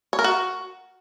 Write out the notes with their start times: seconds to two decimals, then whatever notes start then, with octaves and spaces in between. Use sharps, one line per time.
0.13 C#5
0.19 A#4
0.24 F#4